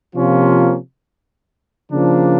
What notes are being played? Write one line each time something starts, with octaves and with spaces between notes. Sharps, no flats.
C3 F3 A#3 C#4 F4
C#3 F3 A#3 D4